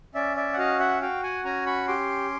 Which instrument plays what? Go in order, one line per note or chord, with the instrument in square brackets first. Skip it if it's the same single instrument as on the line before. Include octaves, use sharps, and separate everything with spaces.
[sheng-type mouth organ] C#4 D5 E5
D5 E5
F#5
F#4 D#5 F5
E5 F#5
F#4 F5 G5
F#5 G#5
C#4 G#5 A#5
B5 C#6
G4 C6 D6